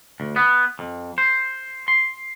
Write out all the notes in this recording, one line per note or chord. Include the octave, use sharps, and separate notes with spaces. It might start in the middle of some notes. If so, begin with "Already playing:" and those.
D2
B3
F2
C5
C6